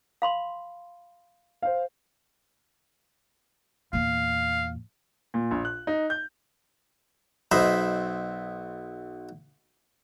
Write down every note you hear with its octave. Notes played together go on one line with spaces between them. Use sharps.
F5 B5 C6
C5 F5
E2 A#2 F5
A#2
A#1
F#6
D#4
G6
B1 C5 D#5 E5 B5